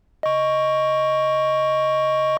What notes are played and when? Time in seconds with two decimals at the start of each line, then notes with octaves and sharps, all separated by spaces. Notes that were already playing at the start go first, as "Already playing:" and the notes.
0.23 D#5 C#6